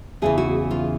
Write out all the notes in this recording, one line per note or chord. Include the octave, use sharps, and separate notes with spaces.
E2 C#3 E3 G#4
F#4
F4